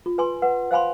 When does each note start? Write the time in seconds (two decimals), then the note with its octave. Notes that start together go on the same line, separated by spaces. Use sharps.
0.06 F4
0.18 B4 G#5 C6
0.42 B4 F#5
0.71 C5 F5 G#5 B5 C6